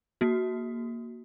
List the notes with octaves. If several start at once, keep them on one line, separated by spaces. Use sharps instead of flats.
A#3 F#4